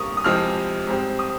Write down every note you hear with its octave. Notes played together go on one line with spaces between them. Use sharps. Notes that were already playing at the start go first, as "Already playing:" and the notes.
Already playing: G2 G3 A#3 C#6 D#6
D#6
F2 C3 F3 G#3 C4 F6
G#2 G3 C4
D#6